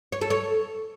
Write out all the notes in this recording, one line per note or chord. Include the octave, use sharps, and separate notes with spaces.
C#5
A4
C#5